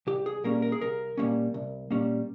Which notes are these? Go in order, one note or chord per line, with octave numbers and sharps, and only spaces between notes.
C2 G4
G#4
A#2 G3 A#3 C#4 A#4
A#4
G#4
C2 A#4
A#2 G3 A#3 C#4
C2
A#2 G3 A#3 C#4